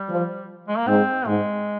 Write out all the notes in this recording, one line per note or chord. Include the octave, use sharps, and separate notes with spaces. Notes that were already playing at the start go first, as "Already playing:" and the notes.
Already playing: G3
F3
G#3
A#3
G#2 C4
G#2 G#3